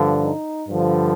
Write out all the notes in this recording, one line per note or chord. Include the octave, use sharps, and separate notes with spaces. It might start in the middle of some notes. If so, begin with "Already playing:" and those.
Already playing: G2 D3 F3
D#4
G2 D3 F3